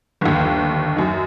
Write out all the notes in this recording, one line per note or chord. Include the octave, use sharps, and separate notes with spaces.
G1 D#2
F#2 D#4